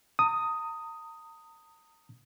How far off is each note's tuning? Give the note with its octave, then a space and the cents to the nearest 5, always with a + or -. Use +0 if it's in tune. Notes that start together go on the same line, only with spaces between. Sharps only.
A#5 -40 D#6 +5